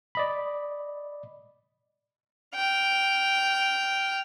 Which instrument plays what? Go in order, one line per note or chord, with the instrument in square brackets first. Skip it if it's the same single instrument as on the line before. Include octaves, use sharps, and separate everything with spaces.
[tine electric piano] D5 D#5 B5
[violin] G5 F6